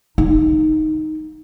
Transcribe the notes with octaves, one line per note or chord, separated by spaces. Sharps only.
D#4